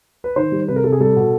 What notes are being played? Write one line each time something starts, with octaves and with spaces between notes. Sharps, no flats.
B4
D#3 C5
G3
C3 B4
A#4
C3 A4
G#4
G3 A4
B2